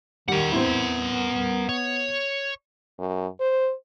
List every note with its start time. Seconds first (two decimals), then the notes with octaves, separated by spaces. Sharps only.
0.28 D#3 G3 A#4 F#5
0.52 B3 C4 E4
1.69 C#5
2.99 F#2
3.40 C5